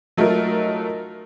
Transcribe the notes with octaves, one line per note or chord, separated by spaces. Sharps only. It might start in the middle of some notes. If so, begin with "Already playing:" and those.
F#3 A3 D#4 F4 A#4